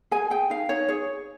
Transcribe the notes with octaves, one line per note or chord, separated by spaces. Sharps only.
G#4 G#5
G#4 G5
D#4 F5
D#4 C#5
G#4 C#5